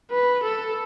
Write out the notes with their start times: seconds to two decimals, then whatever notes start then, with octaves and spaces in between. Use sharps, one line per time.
0.11 B4
0.43 A4